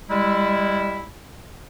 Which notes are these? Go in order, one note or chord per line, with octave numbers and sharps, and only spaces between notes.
G3 G#3 E4